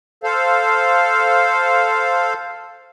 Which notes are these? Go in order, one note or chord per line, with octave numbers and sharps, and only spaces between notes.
A4 C5 F5